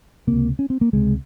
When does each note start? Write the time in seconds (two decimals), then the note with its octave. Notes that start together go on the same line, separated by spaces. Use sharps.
0.27 C#2 C3 A#3
0.59 C#4
0.70 C4
0.81 A#3
0.93 C#2 C3 G#3